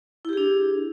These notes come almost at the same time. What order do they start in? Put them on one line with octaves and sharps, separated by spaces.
E4 G4 G#4 D4